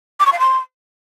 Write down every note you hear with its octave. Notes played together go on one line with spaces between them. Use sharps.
D6
C#6
F5
C6